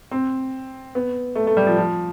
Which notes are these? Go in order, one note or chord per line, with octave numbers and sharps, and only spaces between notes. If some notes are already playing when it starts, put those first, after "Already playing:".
C4
B3
A3
A3
G3
F3
F3